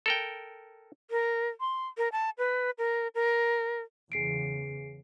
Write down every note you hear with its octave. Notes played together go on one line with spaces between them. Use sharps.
A4 A#4 G5
A#4
C6
A#4
A5
B4
A#4
A#4
E2 C#3 G#4 C7 D7